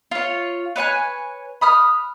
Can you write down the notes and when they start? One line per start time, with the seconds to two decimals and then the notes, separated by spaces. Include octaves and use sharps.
0.11 F4 C#5
0.76 B4 C#5 G#5 F#6
1.61 B5 D#6 F6 F#6